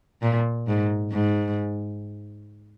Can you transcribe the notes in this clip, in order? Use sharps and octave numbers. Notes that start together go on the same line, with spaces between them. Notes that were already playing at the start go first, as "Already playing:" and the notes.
A#2
G#2
G#2